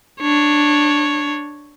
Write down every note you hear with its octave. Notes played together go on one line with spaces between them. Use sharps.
D4 C#5